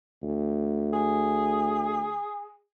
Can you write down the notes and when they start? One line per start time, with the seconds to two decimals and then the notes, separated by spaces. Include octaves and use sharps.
0.23 D2
0.93 G#4